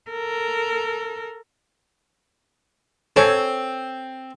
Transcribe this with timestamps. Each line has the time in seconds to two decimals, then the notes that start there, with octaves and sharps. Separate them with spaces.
0.11 A4 A#4
3.16 C4 A4 C#5 G#5